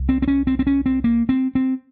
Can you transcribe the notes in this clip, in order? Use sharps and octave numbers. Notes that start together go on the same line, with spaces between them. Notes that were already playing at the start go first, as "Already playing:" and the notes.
Already playing: C2
C4
C4
C#4
C4
C4
C#4
C4
A#3
C4
C4